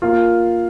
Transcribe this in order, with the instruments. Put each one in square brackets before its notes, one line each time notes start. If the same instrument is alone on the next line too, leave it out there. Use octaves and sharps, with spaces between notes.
[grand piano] A#3 F4